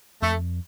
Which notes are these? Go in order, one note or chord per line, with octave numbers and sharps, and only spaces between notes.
F2 A3